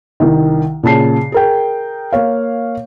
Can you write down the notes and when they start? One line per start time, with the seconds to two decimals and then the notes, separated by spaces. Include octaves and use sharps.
0.20 C2 D#3
0.83 A#2 C#3 A5 C7
1.32 G#4 A#4 G5
2.12 A#3 C#5 F5